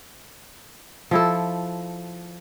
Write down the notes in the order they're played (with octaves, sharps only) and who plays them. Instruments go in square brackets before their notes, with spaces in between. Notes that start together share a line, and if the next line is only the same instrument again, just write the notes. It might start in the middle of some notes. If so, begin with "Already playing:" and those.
[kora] F3 E4 A4